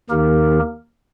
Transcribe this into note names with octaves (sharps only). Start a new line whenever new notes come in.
D#2 D#3 A#3 D#4 G4 A#4